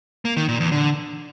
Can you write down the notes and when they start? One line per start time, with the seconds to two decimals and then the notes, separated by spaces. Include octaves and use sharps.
0.25 A#3
0.37 D#3
0.48 A#2
0.60 E2
0.72 D3